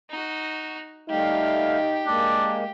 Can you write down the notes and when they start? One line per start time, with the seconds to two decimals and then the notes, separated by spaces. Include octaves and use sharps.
0.10 D#4 F#4
1.10 G3 A3 D#4 G4 F5
2.07 G#3 A#3 D4